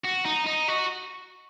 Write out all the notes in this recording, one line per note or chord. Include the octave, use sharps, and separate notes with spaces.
F#4
D#4
D#4
F#4